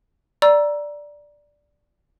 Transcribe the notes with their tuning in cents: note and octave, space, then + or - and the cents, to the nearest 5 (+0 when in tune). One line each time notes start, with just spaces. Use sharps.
D5 +0 A#5 +20 E6 +10